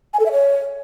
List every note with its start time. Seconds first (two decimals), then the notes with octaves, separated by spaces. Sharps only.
0.13 G#5
0.20 A4
0.26 E5
0.32 C#5